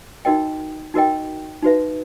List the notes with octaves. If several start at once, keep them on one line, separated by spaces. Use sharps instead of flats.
D#4 F#4 A#4 D#5 G5
D#4 F#4 A#4 D#5 G5
D#4 F#4 B4 E5